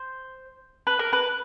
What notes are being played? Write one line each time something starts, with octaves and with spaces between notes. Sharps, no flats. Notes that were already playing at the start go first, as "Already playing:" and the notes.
Already playing: C5
B4
A#4
B4